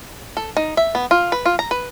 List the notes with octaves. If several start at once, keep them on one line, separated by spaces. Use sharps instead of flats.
A4
D#4
E5
B3
F4
B4
F4
A#5
B4